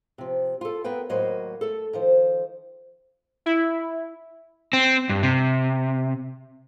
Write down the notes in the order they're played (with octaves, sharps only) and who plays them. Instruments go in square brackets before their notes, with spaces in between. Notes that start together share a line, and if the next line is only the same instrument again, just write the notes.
[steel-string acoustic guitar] C3 F3
F4 A4
A#3 B3 B4 G5
D#2 A2 F#3 A#3 C5 D#5
A3 A4
D#3 F3 C5
[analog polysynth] E4
[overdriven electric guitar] C4
G2
C3